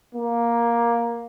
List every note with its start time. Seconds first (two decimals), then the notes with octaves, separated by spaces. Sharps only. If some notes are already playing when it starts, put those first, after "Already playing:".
0.15 A#3